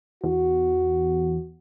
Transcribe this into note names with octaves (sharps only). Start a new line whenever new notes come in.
E2 F#4